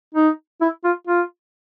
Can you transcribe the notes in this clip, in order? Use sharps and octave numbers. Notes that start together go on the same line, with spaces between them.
D#4
E4
F4
F4